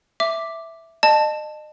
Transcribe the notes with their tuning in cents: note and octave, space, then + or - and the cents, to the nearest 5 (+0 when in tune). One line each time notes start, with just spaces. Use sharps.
E5 +0 D6 +0
D#5 -35 A5 +0